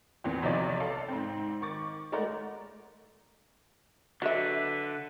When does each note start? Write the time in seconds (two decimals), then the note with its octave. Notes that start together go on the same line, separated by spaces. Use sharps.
0.24 E2 A#2 E3 C4
0.42 B1 C3 F3 F#3 D5
0.80 A4 D5 F5
1.09 G#2 C4
1.62 D#3 C#6 D6 A6
2.12 G#3 A3 A#4 D5 F#5
4.22 D3 F#3 B4 E5